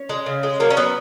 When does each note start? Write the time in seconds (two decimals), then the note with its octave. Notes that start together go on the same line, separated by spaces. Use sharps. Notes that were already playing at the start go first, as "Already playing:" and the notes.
Already playing: C#4
0.09 G#3
0.26 C#3
0.43 G#3
0.60 F#3 A#3
0.70 C#4
0.76 F#3 B3